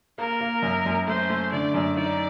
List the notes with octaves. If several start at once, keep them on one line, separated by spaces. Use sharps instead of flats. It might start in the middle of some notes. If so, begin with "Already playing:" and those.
A#3 A#4
A#3
F#2
F#2
A3 C5
A3
D3 D5
F#2
D#4 D5